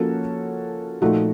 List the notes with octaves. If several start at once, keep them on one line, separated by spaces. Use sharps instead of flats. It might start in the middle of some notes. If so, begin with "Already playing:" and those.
Already playing: F3 A#3 C#4 F#4 A4
A#2 F3 A3 D#4 F#4